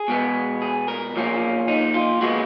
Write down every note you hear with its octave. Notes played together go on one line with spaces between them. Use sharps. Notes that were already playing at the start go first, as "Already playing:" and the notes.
Already playing: G#4
B2 G#3 B3
G#4
A#4
B1 A#2 F3 A#3 C#4
D#4
F4
A#2 G#3 B3 F#4